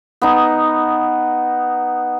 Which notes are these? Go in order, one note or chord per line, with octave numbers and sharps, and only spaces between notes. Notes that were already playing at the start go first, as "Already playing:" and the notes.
B3 D#4